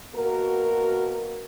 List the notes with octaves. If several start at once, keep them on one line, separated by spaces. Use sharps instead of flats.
B2 A#3 F#4 A#4